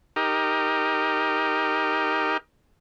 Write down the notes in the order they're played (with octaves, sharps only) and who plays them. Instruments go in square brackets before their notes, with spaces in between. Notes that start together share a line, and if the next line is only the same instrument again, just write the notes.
[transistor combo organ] D#4 G4 A#4